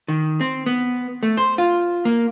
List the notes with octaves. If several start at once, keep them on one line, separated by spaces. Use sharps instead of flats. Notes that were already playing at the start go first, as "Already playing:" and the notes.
D#3
C4
B3
A3
C5
F4
A#3